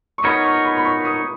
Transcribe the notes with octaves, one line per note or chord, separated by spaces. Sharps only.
C#6
B3 D#4 A#4 C#5 B5
C#6
B5
B5
C#6
D#6